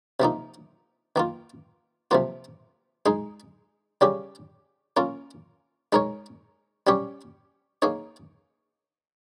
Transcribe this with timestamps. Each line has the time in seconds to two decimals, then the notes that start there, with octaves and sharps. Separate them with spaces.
0.20 C3 F3 A#3 D#4
1.16 D#3 A#3 F4
2.11 C3 F3 A#3 F4
3.06 G#3 D#4 G#4
4.01 C#3 G3 C#4 G4
4.97 A#3 C#4 F4 A#4
5.93 G#3 D#4 A#4 C#5
6.87 G3 C#4 G4 C#5
7.82 A#3 D#4 G#4 C#5